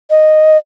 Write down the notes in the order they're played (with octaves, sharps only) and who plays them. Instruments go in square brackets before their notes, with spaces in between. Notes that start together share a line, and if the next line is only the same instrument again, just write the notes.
[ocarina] D#5